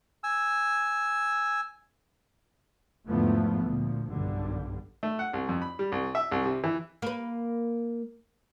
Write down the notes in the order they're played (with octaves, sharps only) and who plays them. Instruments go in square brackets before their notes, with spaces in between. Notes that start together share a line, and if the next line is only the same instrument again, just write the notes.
[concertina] G#5 E6
[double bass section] E2 G#2 D3 F3 A3 B3
D2 A#2 F3
F#1 B1 G2 D3 G3
[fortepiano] A3
F#5
C2
F2
B5
G3
C2
E5
C2
C3
E3
[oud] A#3 B4